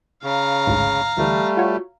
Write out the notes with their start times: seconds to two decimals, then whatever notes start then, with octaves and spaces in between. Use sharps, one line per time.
0.24 C#3 F5 A#5
0.67 A1 D2 G#2
1.18 D2 E3 G3 A3
1.57 F4 F#4 C#5